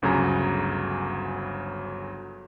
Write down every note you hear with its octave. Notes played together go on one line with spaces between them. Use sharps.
G1 D2 C#3 F#3 G#5 A#5